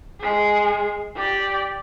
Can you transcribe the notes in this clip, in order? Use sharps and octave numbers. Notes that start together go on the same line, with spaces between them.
G#3 G#4
G4 D5